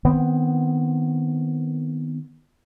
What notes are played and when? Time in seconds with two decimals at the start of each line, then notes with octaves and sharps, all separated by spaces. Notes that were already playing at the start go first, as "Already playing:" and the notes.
0.05 D#3 B3 C4